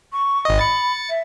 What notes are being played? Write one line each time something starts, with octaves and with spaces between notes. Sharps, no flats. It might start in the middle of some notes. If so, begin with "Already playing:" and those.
C#6
G#1 D#5
B5 A6 C#7
E5